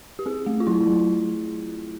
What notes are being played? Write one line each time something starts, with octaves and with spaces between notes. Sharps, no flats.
G4
C4 G#4
A3
F4
F#3 E4
F#3